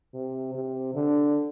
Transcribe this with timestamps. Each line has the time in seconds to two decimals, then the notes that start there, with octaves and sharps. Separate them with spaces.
0.14 C3
0.55 C3
0.94 D3